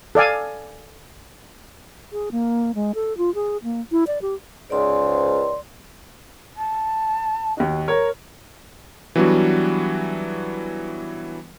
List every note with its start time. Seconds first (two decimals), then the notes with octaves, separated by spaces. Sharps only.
0.15 A4 D5 F5 G#5
2.13 G#4
2.32 A#3
2.75 G#3
2.95 A4
3.18 F4
3.35 G#4
3.64 A#3
3.92 E4
4.07 D5
4.22 G4
4.70 C#2 G#2 D5 C6
6.56 A5
7.57 D#2 D#4 F#4
7.88 A#4 C#5 A#5
9.16 E3 F#3 G3 B3 D4 F#4